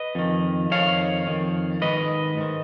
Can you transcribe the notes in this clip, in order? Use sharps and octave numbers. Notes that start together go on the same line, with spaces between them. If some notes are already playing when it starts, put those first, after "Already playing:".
Already playing: B4 D#5
F2 D#3
F2 D#3 C#5 F5
F2 D#3
G#2 D#3 B4 D#5
G#2 D#3